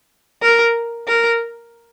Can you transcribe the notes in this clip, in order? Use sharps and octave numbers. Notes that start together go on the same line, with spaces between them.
A#4
A#4